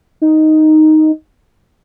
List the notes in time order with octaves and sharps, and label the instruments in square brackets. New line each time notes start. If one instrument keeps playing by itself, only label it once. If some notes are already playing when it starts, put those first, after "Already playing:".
[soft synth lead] D#4